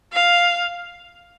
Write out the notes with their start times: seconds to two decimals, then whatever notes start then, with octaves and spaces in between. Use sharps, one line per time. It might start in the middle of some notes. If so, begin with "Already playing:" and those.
0.13 F5